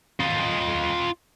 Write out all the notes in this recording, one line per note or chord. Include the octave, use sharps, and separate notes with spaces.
F4 D#5